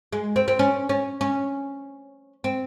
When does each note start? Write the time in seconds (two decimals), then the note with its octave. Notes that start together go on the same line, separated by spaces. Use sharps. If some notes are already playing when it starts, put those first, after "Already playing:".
0.13 G#3
0.36 C4
0.48 C4
0.59 C#4
0.89 C#4
1.21 C#4
2.44 C4